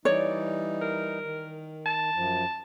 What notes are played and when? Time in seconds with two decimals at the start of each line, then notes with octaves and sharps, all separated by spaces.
0.05 E3 G3 D#4 C#5 D5
0.82 A#4
1.23 D#3
1.86 A5
2.15 F#2 F3